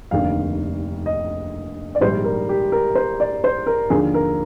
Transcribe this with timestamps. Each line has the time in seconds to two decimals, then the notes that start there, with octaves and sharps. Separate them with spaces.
0.11 F1 D#2 D3 F5
1.06 D#5
1.95 D5
2.01 A#1 G#2 D#3 G3 C5
2.24 A#4
2.49 G4
2.72 A#4
2.95 C5
3.20 D5
3.44 C5
3.67 A#4
3.90 D#2 D3 F3 G#4
4.14 A#4